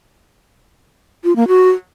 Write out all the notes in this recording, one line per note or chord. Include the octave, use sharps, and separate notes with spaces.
F4
A#3
F#4